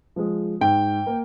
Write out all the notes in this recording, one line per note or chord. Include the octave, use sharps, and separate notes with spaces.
F3 G#3
G#2 G5
A#3